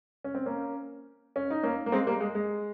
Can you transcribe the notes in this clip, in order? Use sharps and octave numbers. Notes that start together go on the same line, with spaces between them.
C#4
C4
A#3 C#4
C#4
D#4
A#3 C#4
A#3
G#3 C4
G3 A#3
G#3
G#3